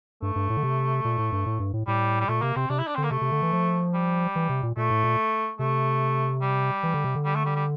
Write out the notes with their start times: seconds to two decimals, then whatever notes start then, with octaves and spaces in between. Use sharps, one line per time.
0.22 G2 A3
0.36 G2
0.50 A2
0.57 D3
0.63 C3
1.05 A#2
1.18 A2
1.32 G2
1.46 A2
1.60 G2
1.73 A2
1.87 A2 G3
2.20 G3
2.29 A#2 A3
2.42 C3 A#3
2.56 C3 C4
2.70 C3 D4
2.79 E4
2.87 D4
2.95 D3 C4
3.03 A#3
3.11 C3 A3
3.21 C3
3.32 D3
3.42 E3
3.53 F3
3.94 G3
4.35 E3
4.49 C3
4.63 A#2
4.77 A#2 A3
4.90 A2
5.04 A#2
5.59 C3 A3
6.42 G3
6.83 E3
6.94 D3
7.04 C3
7.15 D3
7.25 G3
7.35 A3
7.45 G3
7.55 G3